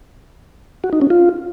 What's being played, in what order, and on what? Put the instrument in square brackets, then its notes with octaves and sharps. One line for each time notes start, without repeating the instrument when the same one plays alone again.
[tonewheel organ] F#4
D#4
C#4
F4